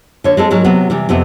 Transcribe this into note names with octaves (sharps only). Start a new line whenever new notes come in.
D3 C#5
G#3 C4 A4
G#2 F#3 G#3 A#4
C3 F#3 B3 C4
C3 E3 G3
F2 C3 A3 B3 C4